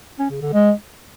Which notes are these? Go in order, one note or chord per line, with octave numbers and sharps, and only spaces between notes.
C#4
C#3
D3
G#3